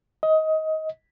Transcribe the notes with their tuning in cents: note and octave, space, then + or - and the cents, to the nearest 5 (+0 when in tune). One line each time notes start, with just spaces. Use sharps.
D#5 +20